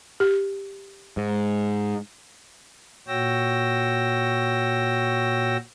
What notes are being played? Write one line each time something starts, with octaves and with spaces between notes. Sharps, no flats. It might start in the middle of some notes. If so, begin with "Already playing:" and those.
G4
G#2
A#2 F#4 C#5 G5 E6 A#6